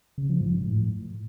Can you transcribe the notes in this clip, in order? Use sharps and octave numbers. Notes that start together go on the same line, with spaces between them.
C#3
F3
G#2
G#2
A2